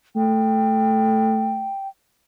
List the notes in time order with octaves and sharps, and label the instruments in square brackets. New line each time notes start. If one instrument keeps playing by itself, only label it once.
[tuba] A3 [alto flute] G5